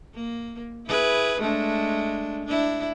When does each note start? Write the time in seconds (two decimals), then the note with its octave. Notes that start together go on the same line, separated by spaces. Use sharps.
0.14 A#3
0.87 E4 G#4 B4
1.40 G#3 A3 D4
2.44 D4 E4